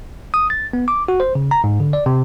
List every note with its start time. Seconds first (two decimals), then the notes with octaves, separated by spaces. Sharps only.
0.34 D#6
0.50 A6
0.73 B3
0.88 D6
1.08 F#4
1.20 C5
1.35 C#3
1.51 A#5
1.64 G#2
1.80 D3
1.93 D5
2.06 C3